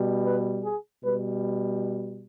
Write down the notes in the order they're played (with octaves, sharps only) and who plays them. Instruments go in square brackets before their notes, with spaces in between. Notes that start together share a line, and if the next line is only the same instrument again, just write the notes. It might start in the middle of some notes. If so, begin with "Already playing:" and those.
Already playing: [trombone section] B2 G3
B4
G#4
B2 G3 B4